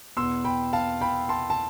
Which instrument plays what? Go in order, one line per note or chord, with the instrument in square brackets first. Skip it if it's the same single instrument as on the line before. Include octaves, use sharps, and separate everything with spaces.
[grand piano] E2 B2 B3 C6 E6
G5 B5
F5 A5
G5 B5
A5 C6
A5